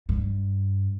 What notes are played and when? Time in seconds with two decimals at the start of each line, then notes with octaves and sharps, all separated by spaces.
0.09 G2